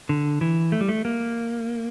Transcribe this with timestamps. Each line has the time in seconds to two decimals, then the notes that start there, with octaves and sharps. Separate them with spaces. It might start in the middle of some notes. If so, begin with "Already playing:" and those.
0.09 D3
0.41 E3
0.72 A3
0.81 G3
0.89 A3
1.05 A#3